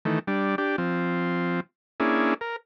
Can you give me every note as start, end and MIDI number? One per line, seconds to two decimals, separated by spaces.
0.05 0.19 51
0.05 0.19 52
0.05 0.19 57
0.27 0.56 55
0.27 0.56 62
0.58 0.76 62
0.58 0.76 67
0.78 1.60 53
0.78 1.60 60
2.00 2.34 58
2.00 2.34 61
2.00 2.34 62
2.00 2.34 64
2.00 2.34 68
2.41 2.56 70